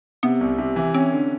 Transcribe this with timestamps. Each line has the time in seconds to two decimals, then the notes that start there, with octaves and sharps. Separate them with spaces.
0.23 C3 B3
0.41 C2
0.58 C3
0.76 E3
0.94 C4 C#4
1.12 D3